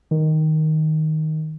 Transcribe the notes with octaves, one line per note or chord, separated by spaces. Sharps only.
D#3